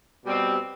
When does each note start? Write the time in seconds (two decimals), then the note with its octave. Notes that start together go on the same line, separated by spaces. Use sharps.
0.24 B2 G3 C4